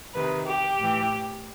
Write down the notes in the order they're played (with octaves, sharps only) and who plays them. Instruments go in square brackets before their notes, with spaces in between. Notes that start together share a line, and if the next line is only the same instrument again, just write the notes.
[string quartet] C3 D#3 B4
G4
A2 E3